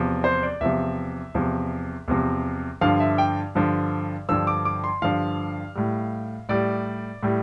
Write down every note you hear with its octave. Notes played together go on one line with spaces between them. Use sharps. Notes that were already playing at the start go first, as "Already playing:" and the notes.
Already playing: E2 C3 F3
C5
D5
E2 C3 F3 E5
E2 C3 F3
E2 C3 F3
G2 D3 F3 F5
E5
G5
G2 D3 F3
G2 D3 F3 E6
D6
D6
C6
G2 D3 F3 F5
A2 G3
A2 G3 D5
A2 G3